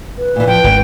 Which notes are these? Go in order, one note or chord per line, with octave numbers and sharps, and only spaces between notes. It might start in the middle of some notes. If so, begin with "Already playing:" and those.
B4
A#2 E3
F3 G5
G#1 E3 C4